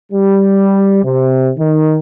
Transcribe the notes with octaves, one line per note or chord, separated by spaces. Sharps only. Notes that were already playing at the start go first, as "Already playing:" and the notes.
G3
C3
D#3